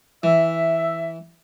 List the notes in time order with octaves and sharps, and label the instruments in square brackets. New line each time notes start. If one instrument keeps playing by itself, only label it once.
[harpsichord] E3 [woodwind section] E5